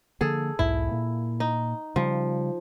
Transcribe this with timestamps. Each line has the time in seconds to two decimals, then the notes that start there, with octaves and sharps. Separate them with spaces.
0.21 D3 F3 A#3 G#4 A4
0.59 B1 E2 G#2 E4
0.91 A#2 A#3
1.40 D#4
1.96 C#3 F3 G3